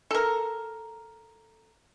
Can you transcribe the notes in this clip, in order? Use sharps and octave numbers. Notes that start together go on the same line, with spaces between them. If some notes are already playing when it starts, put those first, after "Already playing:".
A4 A#4